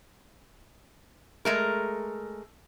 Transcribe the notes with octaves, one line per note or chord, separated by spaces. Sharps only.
G#3 A3 A#4